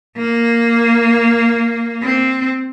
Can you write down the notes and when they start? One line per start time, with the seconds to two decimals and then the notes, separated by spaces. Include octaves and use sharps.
0.17 A#3
2.03 C4